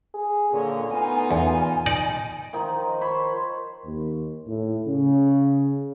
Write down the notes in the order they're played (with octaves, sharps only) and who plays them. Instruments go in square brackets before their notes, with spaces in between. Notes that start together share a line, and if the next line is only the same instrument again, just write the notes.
[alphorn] G#4
[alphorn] A#2 [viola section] D3 C#5 D#5
[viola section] A3 D#4 F4 [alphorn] B3 [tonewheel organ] G#5
[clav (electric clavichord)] E2
D#4 D5
[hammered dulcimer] D#3 F3 D#4
C5 C#5 B5 C6
[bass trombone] D#2
A2
C#3